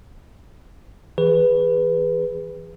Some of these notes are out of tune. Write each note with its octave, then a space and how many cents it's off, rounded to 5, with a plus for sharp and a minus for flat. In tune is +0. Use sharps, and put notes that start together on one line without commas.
E3 -5 G#4 -20 B4 +0